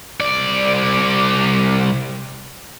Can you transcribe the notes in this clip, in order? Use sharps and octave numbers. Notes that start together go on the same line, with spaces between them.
C2 D5